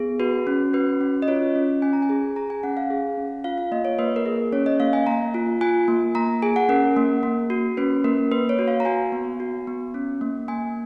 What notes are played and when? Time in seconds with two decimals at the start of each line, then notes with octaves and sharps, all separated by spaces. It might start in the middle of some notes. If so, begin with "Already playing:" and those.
Already playing: B3 G#4
0.20 F#4 B4
0.47 C#4
0.73 F#4 B4
1.01 C#4
1.22 D#5
1.28 F4 C#5
1.55 C#4
1.82 C#4 G#5
1.93 A#5
2.02 G#5
2.09 G#4
2.36 G#4 A#5
2.50 G#5
2.63 C#4 F#5
2.77 F5
2.90 G#4
3.17 C#4
3.44 F4 F5
3.58 F5
3.72 A#3 D#5
3.85 C#5
3.99 A#3 B4
4.16 A#4
4.26 G#4
4.53 C#4 C#5
4.66 D#5
4.80 A#3 F5
4.93 G#5
5.06 A#3 A#5
5.34 F4
5.61 F4 G#5
5.88 A#3
6.15 A#3 A#5
6.42 G#4 G#5
6.56 F#5
6.69 C#4 A#4
6.97 A#3
7.23 A#3
7.50 F#4
7.77 C#4 B4
8.04 A#3 A#4
8.31 A#3 B4
8.49 C#5
8.59 F#4
8.68 F5
8.80 A#5
8.85 F#4 G#5
9.12 B3
9.40 F#4
9.67 B3
9.94 C#4
10.21 A#3
10.48 A#3 G#5